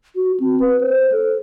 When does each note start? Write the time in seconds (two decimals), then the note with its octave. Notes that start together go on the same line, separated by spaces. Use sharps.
0.16 F#4
0.40 C4
0.60 B4
0.81 C5
1.12 A4